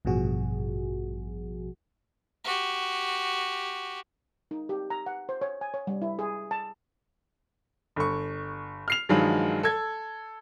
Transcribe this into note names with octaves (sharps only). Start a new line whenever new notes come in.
A1 G2 B2 F3 F#4 G#4
F#4 G4
D#4
G4
A#5
F#5
C5
C#5
G#5
C#5
G3
E4
G#4
A5
G1 C#6
F6 C7 F7
G2 D#3 F3 F#3 G#3
A4 G#6